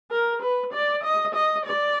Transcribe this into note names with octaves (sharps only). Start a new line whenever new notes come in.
A#4
B4
D5
D#5
D#5
D5